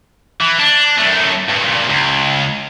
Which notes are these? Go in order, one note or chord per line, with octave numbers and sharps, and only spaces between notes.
E3
D4
F#2 A3
G2 A#2
C#2